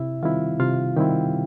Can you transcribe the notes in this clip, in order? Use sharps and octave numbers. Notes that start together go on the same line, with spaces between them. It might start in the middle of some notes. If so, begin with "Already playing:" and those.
Already playing: C3 E4 E5
D#3 G3 C4 E4 F4 F5
C3 F4 F5
D#3 G3 C4 E4 G4 G5